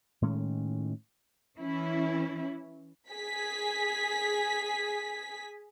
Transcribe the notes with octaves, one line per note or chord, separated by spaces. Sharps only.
A2 D#3 G#3 C#4
E3 C#4 E4
G#4 B6